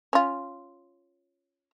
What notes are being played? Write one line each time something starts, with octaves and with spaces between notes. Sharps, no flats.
C#4 F4